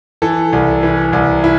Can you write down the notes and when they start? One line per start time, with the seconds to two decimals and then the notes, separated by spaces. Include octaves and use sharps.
0.22 E3 A4
0.53 C2
0.83 E3
1.13 C2
1.44 E4